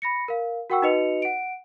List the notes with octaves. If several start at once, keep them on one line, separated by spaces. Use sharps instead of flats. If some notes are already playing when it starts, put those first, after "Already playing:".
B5 A#6 C#7
A#4 F5
F#4 A#4 F#5 G5 C#6 E6
D#4 F#4 B4 D#5 C#7 F7
F#5 D7